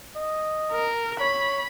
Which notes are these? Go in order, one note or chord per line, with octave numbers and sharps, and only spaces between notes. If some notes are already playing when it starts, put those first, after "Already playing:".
D#5
A#4
C#5 B5